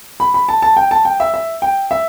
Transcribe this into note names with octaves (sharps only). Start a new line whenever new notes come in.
B5
B5
A5
A5
G5
A5
G5
E5
E5
G5
E5